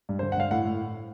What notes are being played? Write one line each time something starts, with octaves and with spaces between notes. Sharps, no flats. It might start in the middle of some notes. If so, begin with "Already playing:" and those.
G2
D3 C5
F#5
G2 F5
A2 F#5
A2